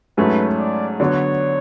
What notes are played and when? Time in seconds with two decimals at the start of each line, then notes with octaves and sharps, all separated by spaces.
0.18 G#2 F#3 A3 C#4 B4
0.58 D5
1.00 D3 F#3 B3 C#5